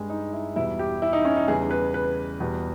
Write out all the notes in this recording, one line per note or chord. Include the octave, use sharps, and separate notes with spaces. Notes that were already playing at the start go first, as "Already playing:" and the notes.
Already playing: G2 G3 G#3
D#4
E4
E2 B2 G3 E4
G4
E4
D#4
C#4
D#4
E2 C#3 G3 G#4
B4
B4
E2 B2 G3